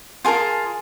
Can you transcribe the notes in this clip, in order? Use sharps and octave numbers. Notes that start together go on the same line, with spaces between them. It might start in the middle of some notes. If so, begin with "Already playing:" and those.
F4 G#4 A#4 A5